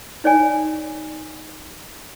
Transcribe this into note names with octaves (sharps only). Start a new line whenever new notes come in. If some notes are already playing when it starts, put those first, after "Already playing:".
D#4 C#5 D5 G#5